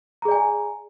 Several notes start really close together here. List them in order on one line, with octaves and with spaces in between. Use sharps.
A#5 G#4 D5 G#5